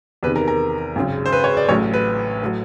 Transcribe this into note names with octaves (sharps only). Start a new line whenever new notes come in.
E2 C3 D#3 B4
A#4
A#4
G#1 F#2 C#3
C5
B4
C#5
D5
A1 A2 F#3 C#5
B4
A2 F#3